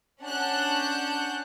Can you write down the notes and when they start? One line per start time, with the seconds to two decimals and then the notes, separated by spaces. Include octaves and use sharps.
0.22 C#4 D4 F#5 A5 F#6 G6